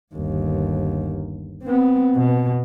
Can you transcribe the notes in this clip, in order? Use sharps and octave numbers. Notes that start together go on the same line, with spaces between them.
G1 D#2
B3 C4
B2